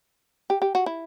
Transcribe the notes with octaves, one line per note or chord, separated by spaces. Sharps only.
G4
G4
F#4
E4